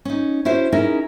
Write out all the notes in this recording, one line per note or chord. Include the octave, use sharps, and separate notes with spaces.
C#4 D#4
C#4 E4 F#4 C5
C#4 D#4 E4 G#4 A#4